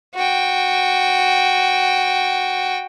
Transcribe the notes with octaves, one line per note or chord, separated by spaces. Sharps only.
F#4 G5